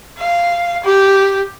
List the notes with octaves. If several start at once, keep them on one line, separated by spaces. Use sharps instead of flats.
F5
G4